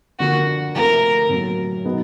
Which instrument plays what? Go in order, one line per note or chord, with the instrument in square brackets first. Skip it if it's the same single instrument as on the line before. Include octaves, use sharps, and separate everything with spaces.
[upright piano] D3 F3 A#3 D4 [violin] F#4
[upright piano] C3 F3 A3 [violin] A#4
[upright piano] A2 F#3 A#3
B2 F#3 B3 D#4 G#4